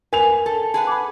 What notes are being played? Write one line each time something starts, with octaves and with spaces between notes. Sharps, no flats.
A#4 B4 G#5 F7
A4
G#4 B4 F#5 A5
B5 D6